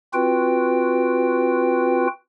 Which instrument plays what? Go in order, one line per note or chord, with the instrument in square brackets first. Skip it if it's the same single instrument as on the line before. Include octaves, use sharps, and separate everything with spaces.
[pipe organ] C4 F4 F#4 B4 G5